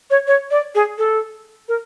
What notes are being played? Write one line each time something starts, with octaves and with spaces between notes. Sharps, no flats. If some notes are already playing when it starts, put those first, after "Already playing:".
C#5
C#5
D5
G#4
A4
A#4